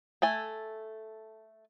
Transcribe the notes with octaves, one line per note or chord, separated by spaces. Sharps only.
A3 A4 G#5